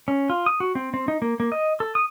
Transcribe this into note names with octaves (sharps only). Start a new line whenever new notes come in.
C#4
F4
D#6
F#4
C4
C4
D#4
A#3
A#3
D#5
A4
D#6